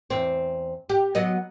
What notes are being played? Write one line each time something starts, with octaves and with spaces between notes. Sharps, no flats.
E2 C4
G4
F#3 B3 D#5